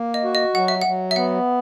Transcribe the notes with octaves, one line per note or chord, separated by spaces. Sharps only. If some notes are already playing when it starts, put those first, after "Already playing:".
Already playing: A#3
D#5
F#4
D#5
F#3 F#5
E5
F#3 F#5
E5
B3 F#5